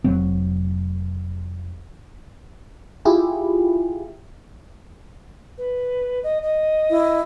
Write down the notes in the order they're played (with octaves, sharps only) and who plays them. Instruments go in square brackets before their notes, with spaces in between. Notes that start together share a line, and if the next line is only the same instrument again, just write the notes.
[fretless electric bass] F1 F#3 C4
[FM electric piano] E4 F4 G4 G#4
[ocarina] B4
D#5
D#5
[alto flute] E4